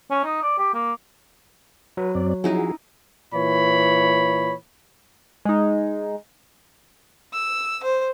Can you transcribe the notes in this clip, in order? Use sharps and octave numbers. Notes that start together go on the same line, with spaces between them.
C#4
D#4
D5
G4
A#3
F#3 B4
F#2 C4 D5
F3 C#4 D#4 E4 F#4 G#4
A#2 E3 C#5 B5
G#3 D#4
E6
C5